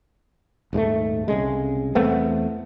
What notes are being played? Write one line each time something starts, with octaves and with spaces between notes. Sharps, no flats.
D#1 G#2 G#3 A3
C2 C#3 G#3
E2 A3 B3 C4